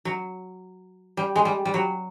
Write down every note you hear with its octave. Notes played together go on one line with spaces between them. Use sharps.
F#3
G3
G#3
G3
G3
F#3